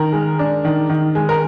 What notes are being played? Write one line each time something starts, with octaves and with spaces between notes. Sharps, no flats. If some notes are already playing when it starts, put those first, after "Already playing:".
Already playing: D#3 A#4
G#3
D4
D#3
D#3
G#3
A#4